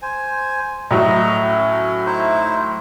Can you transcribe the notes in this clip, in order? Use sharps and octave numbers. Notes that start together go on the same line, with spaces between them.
C5 G#5
A2 F#3 D#5 A#5
C#4
D#4 E4 C5